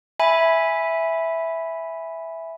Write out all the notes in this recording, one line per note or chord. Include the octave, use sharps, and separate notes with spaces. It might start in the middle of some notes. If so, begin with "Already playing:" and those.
E5 G#5 B5